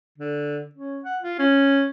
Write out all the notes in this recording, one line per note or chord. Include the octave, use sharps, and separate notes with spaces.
D3
C#4
F#5
F4
C#4